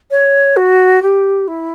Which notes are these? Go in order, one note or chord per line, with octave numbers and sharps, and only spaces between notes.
C#5
F#4
G4
E4